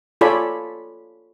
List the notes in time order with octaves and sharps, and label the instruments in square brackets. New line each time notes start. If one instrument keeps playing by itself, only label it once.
[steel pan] F4 A4 C#5 D5 G#5 B5